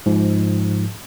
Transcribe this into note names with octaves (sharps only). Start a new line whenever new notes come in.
G#2 F3